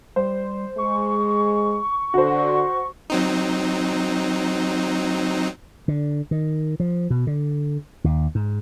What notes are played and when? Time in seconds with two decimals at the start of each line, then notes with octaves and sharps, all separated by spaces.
0.16 G3 C5
0.78 G#3 C#6
2.14 D3 F#4 C5
3.10 F#3 C4 D#4
5.88 D3
6.31 D#3
6.80 F3
7.10 B2
7.27 D3
8.04 D#2
8.35 G#2